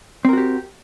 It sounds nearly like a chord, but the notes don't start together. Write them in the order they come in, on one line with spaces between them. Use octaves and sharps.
C4 A#4 F#4 G4